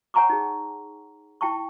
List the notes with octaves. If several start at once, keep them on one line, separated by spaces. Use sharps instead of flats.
C#5 F#5 G#5 A#5 C#6 D6
D#4 G#4
E4 G5 A5 C#6